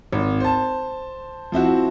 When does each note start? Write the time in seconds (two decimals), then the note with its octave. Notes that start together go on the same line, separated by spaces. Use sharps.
0.12 G#1
0.40 C5 A5
1.52 F3 C4 E4 F#4